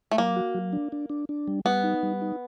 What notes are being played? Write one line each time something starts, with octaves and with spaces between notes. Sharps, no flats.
A3
F#3 A#3
F#4
F#3
D4
D4
D4
D4
G3
G3 B3
D#4
G3
D#4